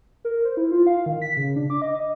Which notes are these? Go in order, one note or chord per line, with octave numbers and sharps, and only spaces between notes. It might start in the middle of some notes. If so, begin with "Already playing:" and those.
A#4
C5
E4
F4
F5
D#3
B6
C#3
D4
D6
D#5
D#5